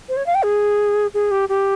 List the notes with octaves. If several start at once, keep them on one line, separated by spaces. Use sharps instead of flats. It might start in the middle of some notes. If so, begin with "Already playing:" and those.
C5
C#5
F5
G5
G#4
G#4
G4
G4